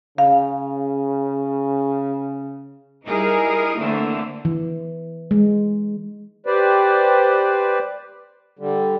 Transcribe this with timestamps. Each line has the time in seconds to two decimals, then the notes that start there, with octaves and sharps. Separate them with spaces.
0.18 C#3 F5
3.05 G3 D#4 E4 G#4 A#4
3.78 D3 E3 A3 A#3 C4
4.45 E3
5.31 G#3
6.46 G4 B4 C5 D5
8.59 D3 G3